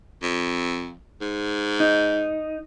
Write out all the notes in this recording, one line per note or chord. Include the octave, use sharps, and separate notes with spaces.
F2
G#2
D#4